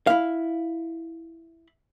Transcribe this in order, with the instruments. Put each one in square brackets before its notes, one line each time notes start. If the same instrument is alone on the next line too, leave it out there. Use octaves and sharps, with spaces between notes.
[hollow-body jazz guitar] E4 F5